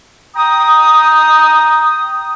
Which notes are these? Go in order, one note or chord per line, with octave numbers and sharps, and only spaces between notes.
G5 A#5 D#6